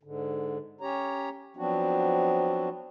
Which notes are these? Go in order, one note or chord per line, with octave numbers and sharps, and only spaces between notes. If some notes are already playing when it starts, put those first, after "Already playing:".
G#2 D3
C#4 G4 C#5 A#5
F3 F#3 B3 C4 D4 F#4